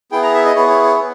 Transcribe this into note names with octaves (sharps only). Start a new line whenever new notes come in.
B3 E4 G#4 G5
A#5
E5
D#5
B3 E4 G#4 C#5
C#5
C#5
B3